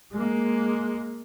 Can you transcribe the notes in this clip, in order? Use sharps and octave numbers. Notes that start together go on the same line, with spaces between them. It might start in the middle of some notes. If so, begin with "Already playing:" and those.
G#3 A#3